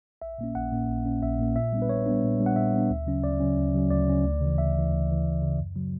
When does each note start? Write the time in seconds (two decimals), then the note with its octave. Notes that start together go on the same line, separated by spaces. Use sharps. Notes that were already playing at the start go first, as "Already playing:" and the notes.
0.22 A#1 E5
0.38 A#2 A#3 C#4
0.55 A#1 F#5
0.72 A#2 A#3 C#4
0.89 A#1
1.06 A#2 A#3 C#4
1.22 A#1 E5
1.39 A#2 A#3 C#4
1.56 A#2 E5
1.72 G3 B3 D4
1.82 B4
1.89 A#2 C#5
2.06 G3 B3 D4
2.23 A#2
2.40 G3 B3 D4
2.46 F#5
2.56 A#2 E5
2.73 G3 B3 D4
2.90 D2
3.07 C#3 F#3 C#4
3.23 D2 D5
3.40 C#3 F#3 C#4
3.57 D2
3.74 C#3 F#3 C#4
3.91 D2 D5
4.08 C#3 F#3 C#4
4.24 D2
4.41 C#3 E3
4.58 D2 E5
4.74 C#3 E3
4.91 D2
5.08 C#3 E3
5.25 D2
5.42 C#3 E3
5.58 F#2
5.75 C#3 F#3